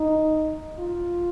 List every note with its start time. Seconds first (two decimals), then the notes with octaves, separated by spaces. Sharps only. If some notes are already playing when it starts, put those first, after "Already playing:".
Already playing: D#4
0.79 F4